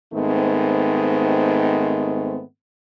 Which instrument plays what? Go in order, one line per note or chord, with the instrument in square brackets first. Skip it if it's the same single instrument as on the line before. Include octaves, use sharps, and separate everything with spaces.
[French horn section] G#2 D#3 A3 B3 C4